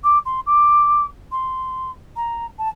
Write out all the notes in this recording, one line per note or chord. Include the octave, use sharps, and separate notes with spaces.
D6
C6
D6
C6
A#5
A5